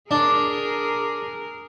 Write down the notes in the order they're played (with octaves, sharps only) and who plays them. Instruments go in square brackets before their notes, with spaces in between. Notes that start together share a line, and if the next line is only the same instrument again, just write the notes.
[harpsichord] D4 [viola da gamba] G#4 A#4